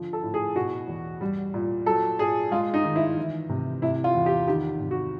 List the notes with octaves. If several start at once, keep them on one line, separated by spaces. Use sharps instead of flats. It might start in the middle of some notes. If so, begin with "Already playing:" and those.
Already playing: D3 F3
A4
A2
G#4
B2 F#4
E2
G3
A#2
F#3 A4
A#2 G#4
G#3 F4
D#4
D#3
E4
E3
C3
C3 E4
F4
E2
G4
D#3 G4
C3
F#4